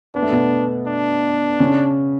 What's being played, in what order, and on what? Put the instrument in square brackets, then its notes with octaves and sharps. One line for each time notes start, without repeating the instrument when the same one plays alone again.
[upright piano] B3 [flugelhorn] D4
[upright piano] A3
B2 B3
[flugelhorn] D4
[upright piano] C#3 C#4